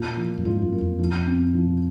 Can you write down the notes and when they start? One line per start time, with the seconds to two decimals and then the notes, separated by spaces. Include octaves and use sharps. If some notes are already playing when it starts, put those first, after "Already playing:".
Already playing: A#2 A#3 F4
0.17 F3
0.38 F#2
0.45 G#2 F4
0.62 F#2
0.72 A#3
0.81 F2
0.99 F3
1.27 C4
1.54 F3